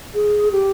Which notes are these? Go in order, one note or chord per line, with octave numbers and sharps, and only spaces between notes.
G#4
G4